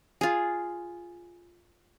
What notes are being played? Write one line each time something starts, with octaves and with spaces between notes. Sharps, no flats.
F4 G#4